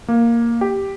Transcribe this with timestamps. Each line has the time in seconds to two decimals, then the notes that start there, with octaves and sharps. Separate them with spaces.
0.08 A#3
0.61 G4